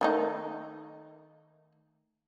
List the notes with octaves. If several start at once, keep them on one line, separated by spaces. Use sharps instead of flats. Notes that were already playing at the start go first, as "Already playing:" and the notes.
D#3 A3 D#4